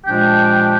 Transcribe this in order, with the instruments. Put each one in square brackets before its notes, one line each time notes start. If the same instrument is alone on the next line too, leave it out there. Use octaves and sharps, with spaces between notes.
[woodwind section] A#2 F3 G#3 D4 G4 G5